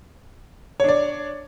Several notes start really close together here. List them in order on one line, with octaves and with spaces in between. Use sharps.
C#5 D4 D5